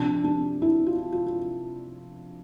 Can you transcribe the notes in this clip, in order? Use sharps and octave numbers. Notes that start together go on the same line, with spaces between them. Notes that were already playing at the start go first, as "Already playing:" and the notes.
Already playing: C3 F3 D4
D4
E4
F4
F4
F4